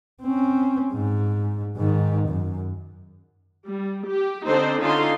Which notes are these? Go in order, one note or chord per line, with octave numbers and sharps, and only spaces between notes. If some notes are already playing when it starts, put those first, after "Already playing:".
C4 C#4
G#2
G#2 D#3
F#2
G3
G4
D3 C4 D4 D#4 C5
D3 C#4 D#4 F4 F5 C6